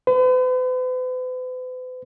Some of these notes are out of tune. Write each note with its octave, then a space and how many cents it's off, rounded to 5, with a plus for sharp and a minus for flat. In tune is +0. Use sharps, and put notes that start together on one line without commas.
B4 +45